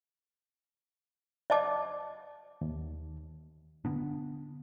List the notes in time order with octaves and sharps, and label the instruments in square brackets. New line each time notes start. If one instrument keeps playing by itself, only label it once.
[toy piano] D5 D#5 A5 D6
[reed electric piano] D#2
[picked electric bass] D3 B3 D4